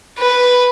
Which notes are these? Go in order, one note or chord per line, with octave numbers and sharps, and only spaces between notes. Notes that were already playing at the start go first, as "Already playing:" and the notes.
B4